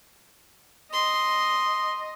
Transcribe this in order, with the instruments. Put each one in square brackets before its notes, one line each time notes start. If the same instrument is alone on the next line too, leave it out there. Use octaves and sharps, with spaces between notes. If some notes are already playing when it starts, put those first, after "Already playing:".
[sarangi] D#5 [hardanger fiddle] C6